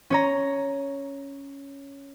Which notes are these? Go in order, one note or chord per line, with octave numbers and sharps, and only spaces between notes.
C#4 C#5 A#5